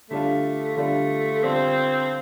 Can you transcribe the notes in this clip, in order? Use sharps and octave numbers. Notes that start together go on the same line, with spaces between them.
D3 G3 A3 D4 F4
D3 G3 A3 D4 F4
D3 G3 C4 D4 F4